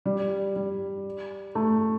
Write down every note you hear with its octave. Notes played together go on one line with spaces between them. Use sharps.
G3
G3
A3